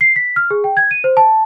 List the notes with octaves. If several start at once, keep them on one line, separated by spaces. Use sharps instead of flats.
C7
B6
F6
G#4
G5
G#6
D#7
C5
A5